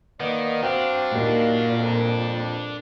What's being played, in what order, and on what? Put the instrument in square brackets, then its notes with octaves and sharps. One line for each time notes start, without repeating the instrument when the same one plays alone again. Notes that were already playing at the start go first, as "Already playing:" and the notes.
[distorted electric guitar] D#3 [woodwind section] A#3 D5 D#5 [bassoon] B3
[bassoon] C4 [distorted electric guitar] D4 G4 [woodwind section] F#4 F5
[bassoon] D#2 [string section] A#2
[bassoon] F2